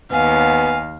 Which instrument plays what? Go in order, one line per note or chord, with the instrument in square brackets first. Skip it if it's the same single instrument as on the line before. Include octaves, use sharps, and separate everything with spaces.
[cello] D#2 [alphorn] B3 [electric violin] F5 [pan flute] G#5